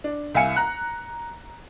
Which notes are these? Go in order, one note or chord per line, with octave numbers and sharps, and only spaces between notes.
D4
C2 E5 F5 G#5 C#7
A#5 F#6